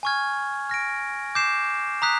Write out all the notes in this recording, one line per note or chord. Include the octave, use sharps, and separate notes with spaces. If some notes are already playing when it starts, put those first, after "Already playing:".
G#5 C#6 F6 G#6
F6 A#6 D7
D6 G6 C7 E7
A#5 D#6 F#6 B6